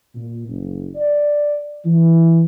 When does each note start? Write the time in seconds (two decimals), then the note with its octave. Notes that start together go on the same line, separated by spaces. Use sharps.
0.15 A#2
0.48 F#1
0.96 D5
1.86 E3